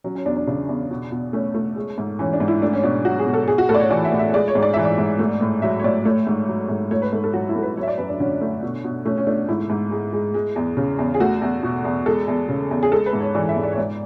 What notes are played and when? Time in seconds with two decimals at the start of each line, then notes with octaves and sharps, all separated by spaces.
0.04 F#3 C#4
0.15 C#4
0.26 E2 D4
0.36 D4
0.47 C#3 D4
0.69 E2
0.91 B2
1.12 B2
1.33 A3 C#4
1.54 A3
1.76 G#3
1.98 G#2
2.19 E3 C#4
2.33 D4
2.40 G#2
2.48 E4
2.62 A3 D4
2.73 C#4
2.83 B2 D4
3.05 F#3 F#4
3.19 G#4
3.27 B2
3.34 A4
3.48 G#3 G#4
3.58 F#4
3.69 A2 A4
3.74 D5
3.80 C#5
3.90 E3 D5
4.05 E5
4.12 A2
4.19 E5
4.34 G#3 D5
4.48 C#5
4.55 G#2
4.63 D5
4.74 E3 E5
4.85 D5
4.98 G#2
5.19 A3
5.41 A2
5.62 F#3 E5
5.80 C#5
5.84 A2 D5
6.05 A3 C#5
6.27 G#2
6.48 F#3
6.69 G#2
6.91 A3 C#5
7.02 B4
7.12 G#2 A4
7.24 A4
7.33 F#3 F#4
7.49 E4
7.56 G#2 A4
7.62 B4
7.77 F#3 C#5
7.83 E5
7.88 D5
7.98 F#2 B4
8.09 D4
8.20 D3 C#4
8.41 A3
8.63 B2
8.84 B2
9.05 A3 C#4
9.18 C#4
9.27 A3 D4
9.49 G#2 E4
9.70 G#2
9.91 G#3
10.13 G#3
10.34 G#3
10.56 E2
10.77 C#3
10.99 E2
11.14 G#4
11.20 A3 F#4
11.42 E2
11.63 B2
11.85 E2
12.06 G#3 A4
12.28 E2
12.49 C#3
12.71 E2
12.83 G#4
12.92 G#3 A4
13.06 B4
13.13 G#2
13.20 C#5
13.35 E3 D5
13.49 E5
13.57 G#2
13.63 D5
13.72 C#5
13.78 G#2 D5